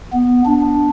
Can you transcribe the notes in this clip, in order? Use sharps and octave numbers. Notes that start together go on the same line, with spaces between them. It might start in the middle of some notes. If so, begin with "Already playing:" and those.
B3
D4